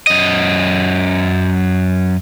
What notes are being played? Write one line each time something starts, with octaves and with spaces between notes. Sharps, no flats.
F#2 D#5